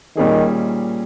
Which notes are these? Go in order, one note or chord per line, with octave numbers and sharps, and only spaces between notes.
A#2 D#3 G3 C#4 G#4